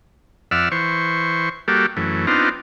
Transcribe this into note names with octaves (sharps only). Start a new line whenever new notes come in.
F2 D5 E5 F#5 E6 F6
E3 C5 C#6
G3 A#3 F#4 G4 A4
F#2 E3 A3
B3 C4 D4 D#4 F4 A#5